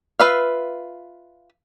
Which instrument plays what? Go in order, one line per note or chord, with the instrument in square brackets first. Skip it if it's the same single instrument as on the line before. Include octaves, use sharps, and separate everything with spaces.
[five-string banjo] F4 B4 E5 F5